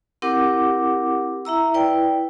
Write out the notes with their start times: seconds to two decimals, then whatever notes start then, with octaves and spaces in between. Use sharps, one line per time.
0.22 C4 E4 G4 A#4 F#5 D6
1.45 E4 E5 A#5 E6
1.74 E4 B4 D5 G5